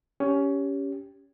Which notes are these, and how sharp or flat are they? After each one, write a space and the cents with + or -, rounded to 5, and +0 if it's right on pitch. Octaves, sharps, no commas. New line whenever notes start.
C#4 +15 G4 +0